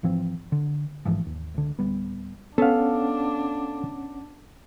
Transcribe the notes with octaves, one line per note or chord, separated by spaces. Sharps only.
G#2 E3 F3 C4
D3
A#1 G#2 E3 F3
D#2
C#2 D3
D1 G3 B3
B3 C#4 D4 A4 F5 F#5